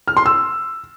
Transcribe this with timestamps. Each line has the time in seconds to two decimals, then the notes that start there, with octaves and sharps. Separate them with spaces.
0.08 F6
0.17 C6
0.26 E6